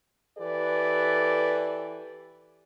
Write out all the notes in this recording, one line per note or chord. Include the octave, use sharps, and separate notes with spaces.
E3 G4 A4 B4 D5